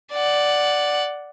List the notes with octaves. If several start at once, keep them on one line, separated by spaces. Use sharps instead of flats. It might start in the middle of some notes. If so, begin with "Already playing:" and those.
D5 F#5